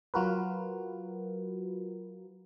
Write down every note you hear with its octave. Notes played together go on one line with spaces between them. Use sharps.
F#3 F4 F#4 A#4 B4